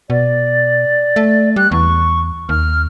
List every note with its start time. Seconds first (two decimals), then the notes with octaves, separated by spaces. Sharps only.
0.10 B2 D5
1.16 A3
1.56 G3 F#6
1.71 E2 C#6
2.49 D#2 F6